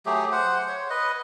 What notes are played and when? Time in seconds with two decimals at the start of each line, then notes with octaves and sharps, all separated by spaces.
0.06 F#3 A3 G4 G#4
0.32 C5 F#5
0.68 C#5
0.90 B4 D#5